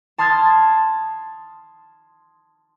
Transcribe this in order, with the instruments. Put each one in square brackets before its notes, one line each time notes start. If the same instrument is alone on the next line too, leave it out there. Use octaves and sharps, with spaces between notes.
[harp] A5 C6 D#6 F6 G#6 A6